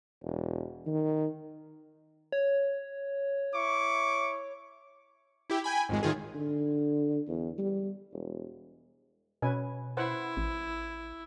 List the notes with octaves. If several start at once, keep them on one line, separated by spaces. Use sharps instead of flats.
E1
D#3
C#5
E4 C#6 D6
E4 G4
G5 G#5 B5
G#1 F2 G#3
A2 D#3 F4 G#4
D3
E2
G3
E1
B2 C#4 B4 G#5
E4 B4 C5 F#5
A1